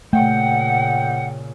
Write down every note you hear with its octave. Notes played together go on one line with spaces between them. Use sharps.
A#2 C#3 A3 F#5 G5